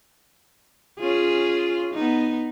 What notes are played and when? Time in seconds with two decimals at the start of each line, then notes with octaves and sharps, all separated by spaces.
0.99 C#4 F4 G#4
1.94 B3 D#4